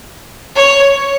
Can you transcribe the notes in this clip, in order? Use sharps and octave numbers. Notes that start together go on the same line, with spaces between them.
C#5